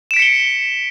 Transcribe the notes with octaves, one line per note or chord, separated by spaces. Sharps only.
B6 C#7 D7 E7 G7